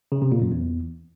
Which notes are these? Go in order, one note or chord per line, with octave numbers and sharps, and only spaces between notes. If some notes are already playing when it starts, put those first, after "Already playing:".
C#3
C3
A#2
F#2
E2